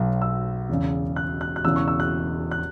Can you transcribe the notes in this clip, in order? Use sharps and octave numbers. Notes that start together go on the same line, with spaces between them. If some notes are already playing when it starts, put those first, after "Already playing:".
Already playing: B1 B2 F#3
E6
E1 E2 C#3
F#6
F#6
F#6
E1 E2 C#3 E3 E6
C#6
E6
F#6
F#6